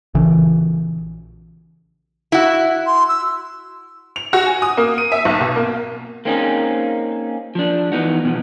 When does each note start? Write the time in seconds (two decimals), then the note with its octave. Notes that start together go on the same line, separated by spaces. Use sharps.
0.15 A#1 C#3 E3
2.32 E4 F#4
2.87 C6
3.09 E6
4.16 F7
4.33 F#4
4.46 G#5
4.62 D#6
4.77 A#3
4.98 D#7
5.12 E5
5.25 B1
5.40 B2
5.56 A#3
6.25 A#3 C4 C#4 D#4 F#4 G#4
7.55 F3 D4
7.92 E3 B3 D#4 F#4
8.25 B2 F3